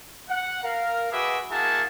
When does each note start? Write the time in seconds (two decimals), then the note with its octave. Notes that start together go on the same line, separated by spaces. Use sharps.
0.29 F#5
0.63 A#4 F5
1.11 F#4 G#4 B4 E5 F#5 D6
1.50 A#3 E4 F#4 G#4 F#5 A5